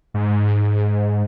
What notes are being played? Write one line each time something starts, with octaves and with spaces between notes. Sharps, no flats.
G#2